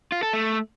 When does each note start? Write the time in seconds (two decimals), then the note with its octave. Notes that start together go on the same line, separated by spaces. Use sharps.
0.12 F4
0.23 A4
0.33 A3